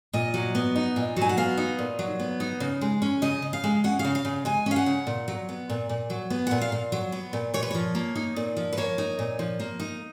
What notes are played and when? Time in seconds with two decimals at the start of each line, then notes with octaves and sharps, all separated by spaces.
0.13 A#2 D#5
0.34 F#3
0.55 B3
0.76 D#4
0.96 A#2
1.16 F#3 G#5
1.29 F#5
1.37 B3 F5
1.57 D#4
1.79 A#2
1.99 F#3
2.20 B3
2.40 D#4
2.60 C#3
2.81 G#3
3.02 C#4
3.22 C#3 D#5
3.42 C#3
3.53 F5
3.64 G#3
3.84 C#4 F#5
3.99 F5
4.04 C#3
4.15 F5
4.25 C#3
4.45 G#3 G#5
4.66 C#4 F5
4.76 F#5
4.86 C#3
5.07 A#2
5.28 F#3
5.49 B3
5.70 A#2
5.89 A#2
6.10 F#3
6.30 B3
6.47 A#2 F#5
6.61 F5
6.72 A#2
6.92 F#3
7.12 B3
7.33 A#2
7.54 A#2 C#5
7.63 B4
7.71 F3 C#5
7.95 A#3
8.16 D#4
8.36 A#2
8.57 F3
8.73 B4
8.77 A#3 C#5
8.98 D#4
9.19 A#2
9.39 F3
9.60 A#3
9.80 D#4